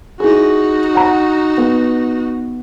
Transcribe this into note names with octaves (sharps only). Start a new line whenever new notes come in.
D#4 E4 F#4 G#4
F#5 A#5
B3